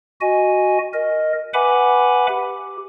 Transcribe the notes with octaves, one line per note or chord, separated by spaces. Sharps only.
F#4 D#5 G#5
A#4 D#5
B4 E5 F#5 G#5 B5 D6
G4